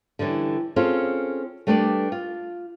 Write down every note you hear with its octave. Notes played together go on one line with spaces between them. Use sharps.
D3 E3 G3 C#4
C4 C#4 F4 G#4 A4
G3 A3 D4 G4 B4 D5
F4